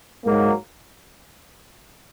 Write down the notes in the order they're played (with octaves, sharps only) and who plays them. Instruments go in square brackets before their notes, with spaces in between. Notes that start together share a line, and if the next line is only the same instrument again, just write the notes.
[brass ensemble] G#2 F#3 A#3